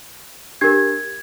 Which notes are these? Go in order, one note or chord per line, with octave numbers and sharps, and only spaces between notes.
D4 G4 A#4 G#6